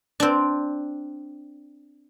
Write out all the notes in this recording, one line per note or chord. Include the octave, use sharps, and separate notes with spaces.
C4 D4